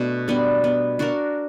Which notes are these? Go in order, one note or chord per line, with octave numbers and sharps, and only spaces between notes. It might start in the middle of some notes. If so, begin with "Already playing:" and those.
Already playing: B2 A3 D4
G3 B3 D4
B3
D4 F#4 A#4